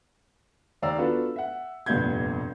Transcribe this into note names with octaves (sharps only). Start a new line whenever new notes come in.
D#2 D5 F5 G5 A#5 E6
B3 D4 F4 F#4 A4 B4
E5 F#5
F1 G2 A#2 B3 G6 G#6